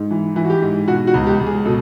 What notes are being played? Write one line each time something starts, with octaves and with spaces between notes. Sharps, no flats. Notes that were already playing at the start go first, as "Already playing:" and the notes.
Already playing: G#2
E3
E3
F#4
G4
G#2
B2 F#4
F#4
C#2
G4
C#2
G#4
B2 A4